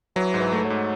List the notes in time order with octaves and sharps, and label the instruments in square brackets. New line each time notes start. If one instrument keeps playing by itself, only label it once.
[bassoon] E3 [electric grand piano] F#3
[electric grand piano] G#2
[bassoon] E3
[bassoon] E3 [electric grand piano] A3
[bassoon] F#3
[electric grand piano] G#2